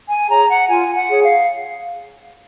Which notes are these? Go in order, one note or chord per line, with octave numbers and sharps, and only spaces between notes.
G#5
G#4 C#5 A#5
F#5
F4 G#5
F#5
G#4 C#5
F5